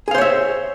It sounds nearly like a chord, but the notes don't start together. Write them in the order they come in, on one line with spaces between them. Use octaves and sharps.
G#4 F5 C5 C#5 E5